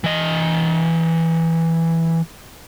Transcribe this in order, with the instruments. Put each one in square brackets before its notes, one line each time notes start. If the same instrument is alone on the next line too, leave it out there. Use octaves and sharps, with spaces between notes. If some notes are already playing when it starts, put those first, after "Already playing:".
[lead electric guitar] E3 D#5